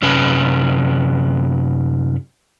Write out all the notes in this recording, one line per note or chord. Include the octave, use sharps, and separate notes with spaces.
F#2 C3 C#4 B4